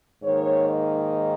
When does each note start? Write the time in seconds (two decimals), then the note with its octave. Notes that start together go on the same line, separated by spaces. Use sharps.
0.24 G#2 D#3 A#3 C#5
0.69 D#5